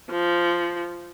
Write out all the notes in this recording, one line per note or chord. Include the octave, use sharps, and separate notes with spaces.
F3